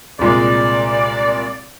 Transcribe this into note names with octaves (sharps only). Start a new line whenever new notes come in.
C2 A#2 G#3 D5